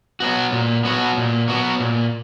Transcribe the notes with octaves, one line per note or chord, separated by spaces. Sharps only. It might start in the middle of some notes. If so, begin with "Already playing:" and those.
F#3 B3 F#4
A#2
F#3 B3 F#4
A#2
F#3 B3 F#4
A#2